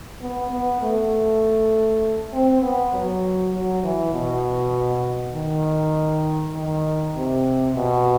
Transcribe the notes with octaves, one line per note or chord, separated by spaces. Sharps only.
B3
B3
A3
C4
B3
F#3
F#3
E3
B2
D#3
D#3
C3
B2